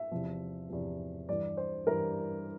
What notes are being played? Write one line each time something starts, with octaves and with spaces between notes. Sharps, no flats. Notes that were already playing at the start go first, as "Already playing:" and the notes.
Already playing: E5
E2 C3 F3
E2 C3 F3
G2 E3 G3 D5
C5
G2 E3 G3 A#4